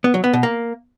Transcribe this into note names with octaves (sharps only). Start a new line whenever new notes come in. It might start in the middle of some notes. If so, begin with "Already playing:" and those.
B3
F#3
B3
B2
A#3